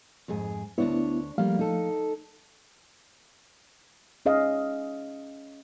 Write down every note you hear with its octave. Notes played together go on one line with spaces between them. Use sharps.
F2 G#2 G#4
D2 B3 D4 E4 C#5
F3 G3 A3 A#3 F4 F5
D#4 A4
C#4 G#4 D#5 F5